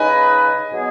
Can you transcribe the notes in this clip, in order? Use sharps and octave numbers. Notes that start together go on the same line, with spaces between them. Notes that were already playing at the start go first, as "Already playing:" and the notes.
Already playing: C#3 G#3 D#4 B4 D#5 G#5
B2 F#3 B3 G#4